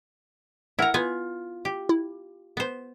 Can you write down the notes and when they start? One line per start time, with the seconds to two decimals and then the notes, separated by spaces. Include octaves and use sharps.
0.79 E4 A#4 F#5 A#5
0.94 B3 F4 G#5
1.65 G4
1.89 E4
2.57 B3 C5